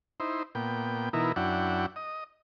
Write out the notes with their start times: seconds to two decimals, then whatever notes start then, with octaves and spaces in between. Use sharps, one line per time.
0.20 D#4 E4 C5
0.55 A#2 B3 G5
1.13 B2 E3 D#4 E4 A#4
1.36 F#2 D4 E4 F#5 G5
1.96 D#5